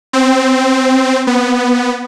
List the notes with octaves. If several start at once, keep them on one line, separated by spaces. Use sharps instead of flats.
C4
B3